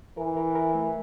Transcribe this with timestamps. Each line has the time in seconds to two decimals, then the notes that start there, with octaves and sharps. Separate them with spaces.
0.17 E3 A#4
0.37 A#4
0.55 A#4
0.75 A3